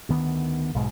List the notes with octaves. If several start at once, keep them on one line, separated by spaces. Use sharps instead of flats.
D2 D#3 B3
B1 G#2 B2